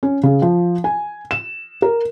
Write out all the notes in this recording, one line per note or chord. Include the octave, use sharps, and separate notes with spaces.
C#4
C#3
F3
G#5
E7
A#4